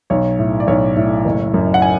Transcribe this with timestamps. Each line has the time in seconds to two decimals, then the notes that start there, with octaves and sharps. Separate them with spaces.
0.10 B1 C#5
0.39 A2
0.60 D5
0.67 B1 C#5
0.96 A2
1.25 F#1
1.54 F#2
1.74 F#5
1.82 G#5